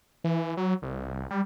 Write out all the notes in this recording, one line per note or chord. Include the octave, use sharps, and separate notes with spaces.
E3
F#3
C2
G3